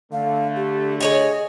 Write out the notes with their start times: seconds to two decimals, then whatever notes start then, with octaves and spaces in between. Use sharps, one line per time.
0.12 D3 A3 F5
0.56 G4
1.01 G#4 C#5 D#5 G#5